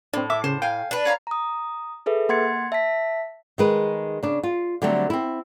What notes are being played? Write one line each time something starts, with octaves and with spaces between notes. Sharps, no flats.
A2 C4 D4
E5 D6
C#3 C5
F5 G5 G#5
D4 B4
C#5 F5 A#5
A#5 D#6
G#4 A4 B4 E5
A#3 F#5 C6 G#6 A6 C#7
E5 A5 B6
D#3 G#3 B4
C#3 D4
F4
D3 F#3 G3 A3 C4
C4 E4